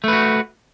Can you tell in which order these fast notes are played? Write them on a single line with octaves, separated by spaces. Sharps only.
A3 B4 F#4